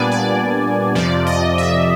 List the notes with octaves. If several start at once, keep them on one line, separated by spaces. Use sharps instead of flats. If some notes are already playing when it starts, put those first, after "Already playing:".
Already playing: A#2 G3 B3 D4 D5 G#5
D5
F2 C3 F3 D5
D#5
E5